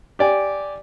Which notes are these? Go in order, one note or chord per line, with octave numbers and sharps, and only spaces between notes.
G4 D5 G#5